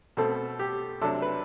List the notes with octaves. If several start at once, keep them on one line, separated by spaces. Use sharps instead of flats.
B2 A3 C4 A4
G4
C3 F#3 A3 D4 A4
B4